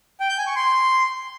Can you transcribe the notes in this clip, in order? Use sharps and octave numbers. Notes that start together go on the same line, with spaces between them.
G5
G6
G#5
C#6
C6